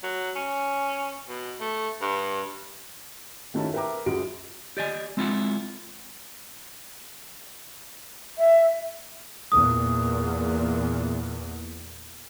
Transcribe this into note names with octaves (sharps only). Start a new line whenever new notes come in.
F#3
C#4
B2
A3
G2
D#3 A3 C#4 E4 F#4 A5
A#4 B4 E5 G5 A#5 D6
C#2 F#2 C#3 F#3 D7
G4 D5 D#5 G#5
G#3 C4 E4 F4 F#5
E5
E2 A#2 D#6